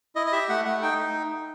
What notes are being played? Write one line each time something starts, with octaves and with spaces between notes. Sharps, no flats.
E4 D#5
D#5
G4 E5
A3 F#5
A3 F#5
D#4 G5